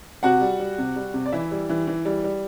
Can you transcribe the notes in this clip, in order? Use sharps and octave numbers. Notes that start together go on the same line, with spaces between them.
C3 F#4 F#5
G3
G3
C3
G3
C3
D5
E3 E4 E5
G3
E3
E3
G3
G3